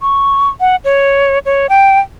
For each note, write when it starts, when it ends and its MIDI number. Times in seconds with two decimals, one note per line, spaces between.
0.01 0.49 85
0.60 0.76 78
0.84 1.38 73
1.45 1.67 73
1.69 1.99 79